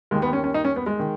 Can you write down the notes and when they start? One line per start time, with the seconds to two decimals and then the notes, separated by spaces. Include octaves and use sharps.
0.11 D#2 D#3 G#3
0.22 B3
0.33 C#4
0.44 C#4
0.54 D#4
0.65 C#4
0.76 B3
0.86 G#3
0.99 D#3